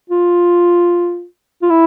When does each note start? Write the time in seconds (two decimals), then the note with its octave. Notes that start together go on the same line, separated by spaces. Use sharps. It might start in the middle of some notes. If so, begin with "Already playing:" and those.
0.10 F4
1.62 F4
1.70 E4